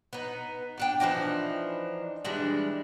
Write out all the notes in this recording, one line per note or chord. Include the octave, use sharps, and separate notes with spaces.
B3 D#4
B3 D4 G5
E3 F3 D4 D#4
E3 G3 G#3 D4